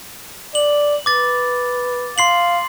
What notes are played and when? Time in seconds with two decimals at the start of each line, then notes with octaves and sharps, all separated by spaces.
0.55 D5 F#7
1.06 B4 D6 A6
2.18 F5 C6 C7 F#7